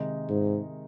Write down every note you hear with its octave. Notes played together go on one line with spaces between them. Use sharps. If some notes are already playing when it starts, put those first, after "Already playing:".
Already playing: C3 D#3 G#3 D#4
G#2